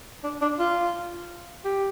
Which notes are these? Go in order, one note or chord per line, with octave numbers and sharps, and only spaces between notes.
D4
D4
F4
G4